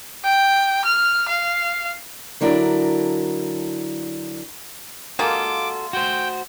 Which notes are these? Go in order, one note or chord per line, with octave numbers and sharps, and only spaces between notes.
G5
F6
F5
D3 F#3 D4 E4 A#4
G#3 A#3 F4 F#4 A4 D6
F#4 C5 G5